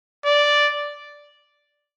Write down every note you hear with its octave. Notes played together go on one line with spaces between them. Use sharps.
D5